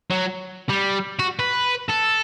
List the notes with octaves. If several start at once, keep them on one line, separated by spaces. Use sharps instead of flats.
F#3
G3
F#4
B4
A4